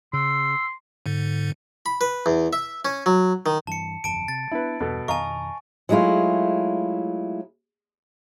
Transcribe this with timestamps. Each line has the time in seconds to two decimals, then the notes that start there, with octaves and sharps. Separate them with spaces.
0.13 C#3 C6 E6
1.06 G#2 D3
1.86 B5
2.01 B4
2.26 E2
2.53 E5
2.85 C#4
3.06 F#3
3.46 D#3
3.67 G2 E3 A5 C#7
4.04 G1 F2 A5 D7
4.28 C3 A6
4.51 B3 D4 E4 B4
4.80 E2 G2 B2 B3 A4
5.08 F2 B2 D#3 D#5 F5 G#5 A#5 C#6
5.89 F#3 G#3 A3 E4 F4